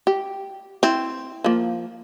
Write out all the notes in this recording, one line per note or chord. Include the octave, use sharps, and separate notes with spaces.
G4
C4 E4
F3 A#3